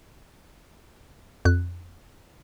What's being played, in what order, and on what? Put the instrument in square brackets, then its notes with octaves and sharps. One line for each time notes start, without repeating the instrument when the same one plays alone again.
[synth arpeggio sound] F2 F#6